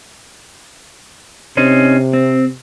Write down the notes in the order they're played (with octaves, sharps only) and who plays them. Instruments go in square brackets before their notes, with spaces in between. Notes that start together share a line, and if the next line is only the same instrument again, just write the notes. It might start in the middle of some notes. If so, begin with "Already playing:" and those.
[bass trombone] C3 [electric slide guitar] C4 C#4 D#4
[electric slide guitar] C4